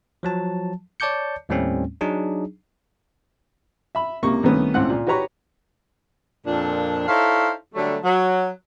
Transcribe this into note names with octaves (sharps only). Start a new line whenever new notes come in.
F3 F#3 A5
C#5 D5 A5 D6 G6 C#7
D#2 A2 G3 A3 C4 C#4
F#3 D4 D#4 G#4
E5 B5
C#2 C3 A#3 C#6
C2 D#3 A3 B3 C#4
C#2 A2 C4 F#5 F#6
A#2
F#4 G4 B4 C#5 A#5 C#6
F2 A#2 D4
D#4 E4 A4 C5 C#5 F5
D3 F#3 G3 A3
F#3